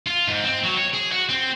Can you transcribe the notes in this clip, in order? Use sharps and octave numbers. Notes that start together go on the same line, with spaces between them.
F4
G#2
C4
F#3
C#5
G#4
F#4
C4